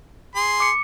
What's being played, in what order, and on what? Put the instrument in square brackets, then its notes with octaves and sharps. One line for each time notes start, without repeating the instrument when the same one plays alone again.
[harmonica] G#4 C6
[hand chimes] D6 C#7